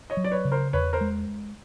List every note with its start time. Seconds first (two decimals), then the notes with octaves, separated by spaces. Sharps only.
0.10 C#5 D#5
0.17 F#3
0.24 D5
0.31 B4 C#5
0.45 C#3
0.52 A#4 C5
0.73 E2 B4 C#5
0.93 A#4 C5
1.01 G#3